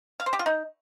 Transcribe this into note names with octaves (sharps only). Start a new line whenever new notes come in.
F5
C5
G4
F4
D#4